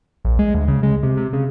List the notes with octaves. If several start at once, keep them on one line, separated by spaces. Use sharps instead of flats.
A#1
G#3
D2
C#3
G#3
C3
C3
C#3